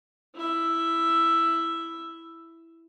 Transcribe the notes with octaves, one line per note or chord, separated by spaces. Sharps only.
E4 E5